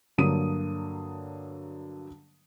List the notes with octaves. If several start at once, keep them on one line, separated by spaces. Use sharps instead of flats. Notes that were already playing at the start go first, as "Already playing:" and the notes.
G2 D3 F#3 A#3 D#6 D#7